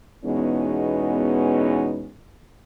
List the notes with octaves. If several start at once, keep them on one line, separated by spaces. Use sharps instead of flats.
E2 B2 G#3 B3 C#4 D#4